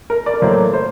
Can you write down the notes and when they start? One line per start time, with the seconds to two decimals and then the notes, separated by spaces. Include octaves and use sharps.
0.10 A#4
0.26 D5
0.34 A#4
0.42 A2 F#3 A#3 C5
0.74 C5